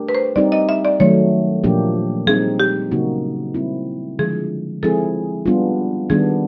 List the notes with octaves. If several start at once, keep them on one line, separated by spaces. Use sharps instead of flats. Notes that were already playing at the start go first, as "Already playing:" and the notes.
Already playing: A3 D4 G4 A#4
B4
C5
G3 C4 D#4 G4 D5
D#5
E5
D5
D#3 F#3 A3 C#5
A#2 F3 A#3 D4 G4
G3 C4 D#4 G#4
G4
C#3 F#3 A#3 D#4 F#4
G3 C4 E4
D3 F3 G#3 G#4
F3 G#3 C4 E4 G#4 A4
G3 B3 D4 F4
D#3 G3 B3 D4 G#4